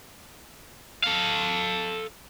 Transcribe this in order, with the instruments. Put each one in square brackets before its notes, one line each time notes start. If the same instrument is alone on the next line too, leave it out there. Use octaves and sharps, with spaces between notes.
[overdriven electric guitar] A4 F5